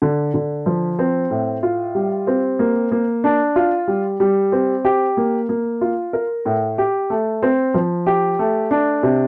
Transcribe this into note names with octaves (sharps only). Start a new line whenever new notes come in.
D3
D3
F3
C4
A2
F4
G3
C4
A#3
A#3
D4
F4
G3
G3
C4
G4
A#3
A#3
F4
A#4
A2
G4
A3
C4
F3
G4
A3
D4
C3